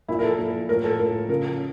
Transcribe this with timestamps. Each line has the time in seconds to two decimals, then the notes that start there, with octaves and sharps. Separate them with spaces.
0.08 A#2 F3 E4
0.19 A#4
0.23 A4
0.39 A#2 F3
0.69 A2 F3 A#4
0.84 A4
0.98 A2 F3 A#4
1.29 C#3 F3 A#4